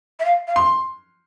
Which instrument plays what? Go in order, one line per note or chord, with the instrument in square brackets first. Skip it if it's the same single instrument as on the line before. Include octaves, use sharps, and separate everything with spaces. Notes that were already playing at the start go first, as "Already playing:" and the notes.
[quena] E5
F5
F5
[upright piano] C6